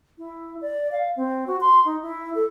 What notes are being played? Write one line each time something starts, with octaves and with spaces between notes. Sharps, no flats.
E4
D5
F5
C4
F#4
C6
D#4
E4
A4